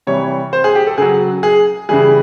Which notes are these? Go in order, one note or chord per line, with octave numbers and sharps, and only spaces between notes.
C3 E3 G3 C#5
C5
G#4
G4
A4
C#3 F#3 G#4
G#4
C#3 E3 G3 G#4